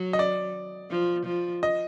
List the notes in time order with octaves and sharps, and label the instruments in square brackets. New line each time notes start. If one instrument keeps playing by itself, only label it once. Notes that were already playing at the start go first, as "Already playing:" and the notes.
Already playing: [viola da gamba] F#3
[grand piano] D#5
D5
[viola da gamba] F3
F3
[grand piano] D#5